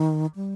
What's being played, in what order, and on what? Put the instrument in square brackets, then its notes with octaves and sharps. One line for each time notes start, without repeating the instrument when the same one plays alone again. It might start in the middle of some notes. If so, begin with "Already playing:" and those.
Already playing: [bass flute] D#3
G3